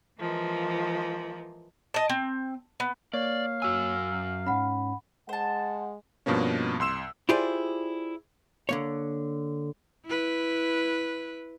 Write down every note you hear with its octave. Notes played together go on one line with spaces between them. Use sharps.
E3 F3 G#3 A#3
D#5 A5
C4
B3
A#3 C#5 D5 F5
F#2 F#4 G#5 E6
G#2 C#4 F#5 B5
G#3 C5 F#5 A5
G2 B2 F3 A#3 C#4
C2 C6 E6 E7
E4 F4 G4 G#4 C5 D5
D3 A#3 C#5
E4 B4